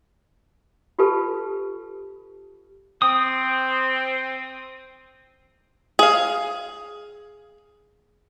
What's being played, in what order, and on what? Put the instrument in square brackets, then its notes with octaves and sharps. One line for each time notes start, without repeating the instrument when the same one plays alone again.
[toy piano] F4 G4 A4 B4 A5
[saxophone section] C4 [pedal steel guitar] D#6
[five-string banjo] G#4 F5